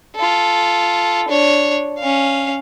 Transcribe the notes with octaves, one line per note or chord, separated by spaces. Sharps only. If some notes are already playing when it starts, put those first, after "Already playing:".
F4 A4
D4 C#5
C#4 F5